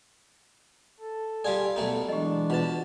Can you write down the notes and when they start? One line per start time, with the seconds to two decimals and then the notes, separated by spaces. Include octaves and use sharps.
1.00 A4
1.45 G3 F4 G#4 D5 F5
1.76 B1 A3 B3 D#4
2.09 E3 G#3 D4 G4 D#5
2.50 B2 F4 B4 A5